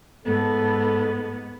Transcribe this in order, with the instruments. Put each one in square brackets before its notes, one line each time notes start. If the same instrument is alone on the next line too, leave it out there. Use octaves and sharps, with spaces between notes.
[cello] G#2 B3 [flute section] A4